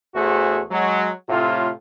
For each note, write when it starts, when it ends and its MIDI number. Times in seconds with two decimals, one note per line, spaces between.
0.15 0.61 33
0.15 0.61 40
0.15 0.61 57
0.15 0.61 66
0.15 0.61 68
0.15 0.61 72
0.70 1.09 54
0.70 1.09 56
1.29 1.70 45
1.29 1.70 48
1.29 1.70 65